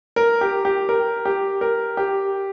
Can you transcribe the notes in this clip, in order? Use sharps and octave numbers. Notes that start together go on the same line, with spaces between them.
A#4
G4
G4
A#4
G4
A#4
G4